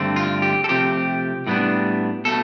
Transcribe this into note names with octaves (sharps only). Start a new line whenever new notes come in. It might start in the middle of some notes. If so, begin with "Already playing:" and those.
Already playing: G2 D3 A3 C4
F4
G4
A4
C3 F3 A3 C4 G4
A2 G3 B3 D4
B2 A3 A4